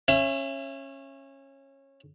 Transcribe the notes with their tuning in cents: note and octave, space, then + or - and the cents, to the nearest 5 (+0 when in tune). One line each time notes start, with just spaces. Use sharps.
C#4 -20 E5 +30